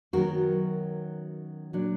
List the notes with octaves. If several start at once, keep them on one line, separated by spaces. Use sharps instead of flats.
F#2 D#3 F#3 B3 F#4 A#4
A#2 F#3 D4